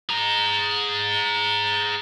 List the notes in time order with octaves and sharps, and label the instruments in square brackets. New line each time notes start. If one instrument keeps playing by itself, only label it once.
[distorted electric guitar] G#4 A#5